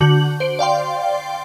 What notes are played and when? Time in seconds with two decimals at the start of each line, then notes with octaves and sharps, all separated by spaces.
0.01 D3 F#4 G6 F#7
0.40 C5 D7
0.59 D5 F5 G5 C6